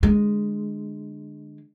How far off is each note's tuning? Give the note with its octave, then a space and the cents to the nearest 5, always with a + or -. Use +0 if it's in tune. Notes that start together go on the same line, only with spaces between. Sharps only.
D3 +15 G#3 +0